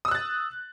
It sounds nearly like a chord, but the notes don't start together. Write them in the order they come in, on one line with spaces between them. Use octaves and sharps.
D#6 E6 F#6 A6